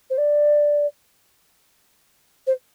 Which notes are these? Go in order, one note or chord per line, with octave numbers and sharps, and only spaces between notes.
C5
D5
C5